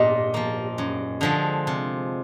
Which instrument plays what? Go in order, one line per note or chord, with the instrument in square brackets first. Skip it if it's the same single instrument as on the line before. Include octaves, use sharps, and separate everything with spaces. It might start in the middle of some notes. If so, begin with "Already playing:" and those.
Already playing: [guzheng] A#2 D4 F4 [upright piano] D#5
[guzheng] F3 A#3
F#2
D3 F3 G#3
C3